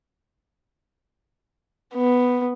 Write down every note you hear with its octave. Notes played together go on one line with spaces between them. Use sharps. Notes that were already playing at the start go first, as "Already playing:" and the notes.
B3